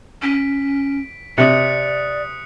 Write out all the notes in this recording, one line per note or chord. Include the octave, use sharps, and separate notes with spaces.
C#4 B6 D7
C3 D5 D#6 F#6 C#7